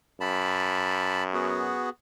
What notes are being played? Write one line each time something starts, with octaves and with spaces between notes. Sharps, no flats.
F#2 A5 B5
B3 F#4 G#4